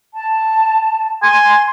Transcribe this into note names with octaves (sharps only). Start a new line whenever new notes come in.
A5
G#5 C6